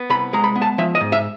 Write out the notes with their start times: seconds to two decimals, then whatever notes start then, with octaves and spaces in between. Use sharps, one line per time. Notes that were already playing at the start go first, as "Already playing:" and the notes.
Already playing: B3
0.10 C2 B5
0.33 G#3 A#5
0.44 B5
0.55 B3
0.62 A5
0.78 F3 E5
0.95 D#5
1.01 G#2
1.12 E5